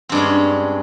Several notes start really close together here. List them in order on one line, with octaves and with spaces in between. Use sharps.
C4 G2 G#3 C#4